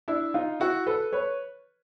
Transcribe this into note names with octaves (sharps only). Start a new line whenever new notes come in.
D4 E4
D#4 F4
E4 F#4
A4 B4
B4 C#5